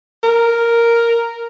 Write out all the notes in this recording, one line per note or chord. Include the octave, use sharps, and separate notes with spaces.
A#4